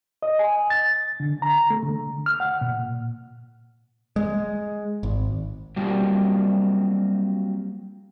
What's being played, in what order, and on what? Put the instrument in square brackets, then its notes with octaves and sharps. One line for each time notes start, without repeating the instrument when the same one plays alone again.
[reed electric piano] D#5
G#5
A6
D3
A#5
A3
D3
F6
F#5
A#2
[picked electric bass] G#3
G#1
[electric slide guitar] F#3 G3 A#3 C4 F4 G4